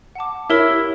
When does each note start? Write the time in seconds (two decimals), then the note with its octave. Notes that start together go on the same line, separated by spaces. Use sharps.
0.15 F#5 A5 D6
0.49 E4 G4 A#4 C#5